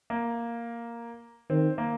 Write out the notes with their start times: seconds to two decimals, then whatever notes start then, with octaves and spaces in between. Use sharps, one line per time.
0.10 A#3
1.50 D#3 C4
1.78 A#3